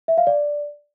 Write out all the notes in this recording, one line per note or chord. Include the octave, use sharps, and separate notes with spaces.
E5
F5
D5